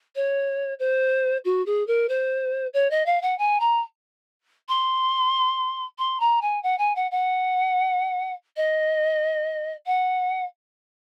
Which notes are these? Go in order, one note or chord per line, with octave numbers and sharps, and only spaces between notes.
C#5
C5
F#4
G#4
A#4
C5
C#5
D#5
F5
F#5
G#5
A#5
C6
C6
A#5
G#5
F#5
G#5
F#5
F#5
D#5
F#5